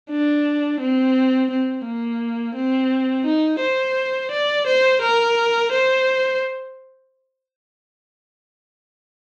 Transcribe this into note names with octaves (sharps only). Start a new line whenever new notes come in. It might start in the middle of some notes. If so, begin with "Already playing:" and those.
D4
C4
C4
A#3
C4
D#4
C5
D5
C5
A#4
C5